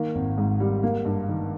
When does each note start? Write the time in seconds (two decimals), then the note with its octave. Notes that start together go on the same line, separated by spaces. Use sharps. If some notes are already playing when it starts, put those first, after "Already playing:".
Already playing: D#3 A#3
0.15 G#1
0.38 G#2
0.60 G3
0.83 A#3
1.05 G2
1.29 D#3